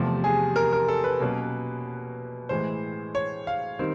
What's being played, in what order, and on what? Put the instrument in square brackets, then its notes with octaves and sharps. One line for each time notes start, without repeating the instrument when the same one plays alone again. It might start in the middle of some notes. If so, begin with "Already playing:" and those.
Already playing: [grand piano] E2 C3 F3 A3
G#4
A#4
A#4
A4
B4
B2 F#3 A#3 C#4
A2 E3 G#3 C5
C#5
F5
D#3 G3 C4